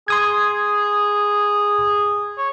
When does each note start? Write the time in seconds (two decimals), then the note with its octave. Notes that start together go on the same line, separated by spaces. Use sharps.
0.08 G#4 C6 D#6 G#6
2.38 C#5